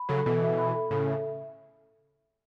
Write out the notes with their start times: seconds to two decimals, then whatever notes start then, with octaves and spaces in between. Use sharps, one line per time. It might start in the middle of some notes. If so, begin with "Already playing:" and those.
Already playing: B5
0.09 C#3 F#3 A4
0.26 B2 E3 A4
0.42 E5
0.58 B5
0.75 A4
0.91 A2 C#3 A4
1.08 E5